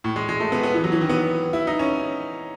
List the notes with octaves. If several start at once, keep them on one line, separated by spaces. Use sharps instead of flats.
A2
G#3
G#3
A3
B3
B3
E3
F#3
E3
D#3
B3
E4
D#4
C#4